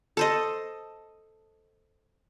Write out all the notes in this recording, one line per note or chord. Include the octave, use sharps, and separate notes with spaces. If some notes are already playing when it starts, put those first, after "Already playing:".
A4 C5 D#5